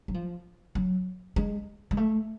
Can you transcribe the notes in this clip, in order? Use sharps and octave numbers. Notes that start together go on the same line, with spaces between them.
F#3
F3
F#3
G#3
G#3
A3